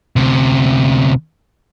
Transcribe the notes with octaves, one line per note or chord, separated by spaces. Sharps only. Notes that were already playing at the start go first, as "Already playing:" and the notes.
D2 C3